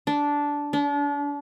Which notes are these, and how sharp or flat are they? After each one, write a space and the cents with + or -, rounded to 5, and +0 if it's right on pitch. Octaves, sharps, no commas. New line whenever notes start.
D4 -10
D4 -35